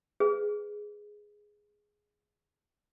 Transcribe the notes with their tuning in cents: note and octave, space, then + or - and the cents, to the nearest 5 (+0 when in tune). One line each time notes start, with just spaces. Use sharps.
G#4 +0 B4 +20